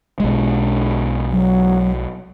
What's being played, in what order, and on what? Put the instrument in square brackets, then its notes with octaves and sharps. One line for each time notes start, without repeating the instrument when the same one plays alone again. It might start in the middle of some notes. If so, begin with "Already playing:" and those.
[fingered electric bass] B1 G#3
[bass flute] F#3